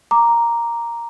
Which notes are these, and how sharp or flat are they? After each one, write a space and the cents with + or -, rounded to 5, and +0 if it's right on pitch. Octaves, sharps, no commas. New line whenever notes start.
A#5 +0 D6 +0